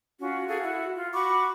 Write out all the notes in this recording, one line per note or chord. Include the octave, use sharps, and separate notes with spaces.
C#4 F4 F#4
F#4 G#4 A4 F5
E4 F#4
F4
F#4 B5 C#6 D6